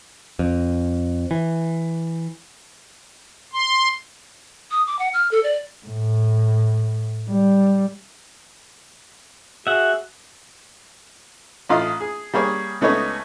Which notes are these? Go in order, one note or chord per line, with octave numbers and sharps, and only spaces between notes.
F2
E3
C6
D#6
D6
F#5
F6
A4
D5
A2
G3
F#4 G#4 E5 F#5
A1 F4 D#5 D#6
G#4
G3 A#3 G#4 C#5
C#2 A3 B3 C#4 D#4 C#5